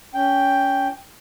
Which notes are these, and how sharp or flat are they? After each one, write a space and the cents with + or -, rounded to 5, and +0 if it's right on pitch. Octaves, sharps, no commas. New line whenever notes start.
C#4 +20 G5 +0